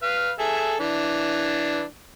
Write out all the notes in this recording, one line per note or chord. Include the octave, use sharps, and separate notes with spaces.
B4 F5
G#4 A4 E5
E3 D4